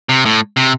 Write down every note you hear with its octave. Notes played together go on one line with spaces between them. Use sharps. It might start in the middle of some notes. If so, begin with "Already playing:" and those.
C3
A2
C3